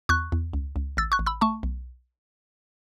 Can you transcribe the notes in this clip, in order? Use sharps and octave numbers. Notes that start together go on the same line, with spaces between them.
E2 C#6 F#6
E2
C#2
C#2
A1 E6 A6
C#6 F#6
A1
B5 E6
A3 A5 C#6
B1